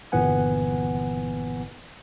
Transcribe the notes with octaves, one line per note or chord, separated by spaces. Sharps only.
G1 A#2 E3 B3 F#5 G#5